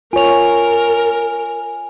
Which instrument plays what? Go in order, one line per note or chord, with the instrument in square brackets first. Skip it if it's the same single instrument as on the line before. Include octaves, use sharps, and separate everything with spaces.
[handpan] F4 C#5 [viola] A#4 [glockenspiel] G#5 F7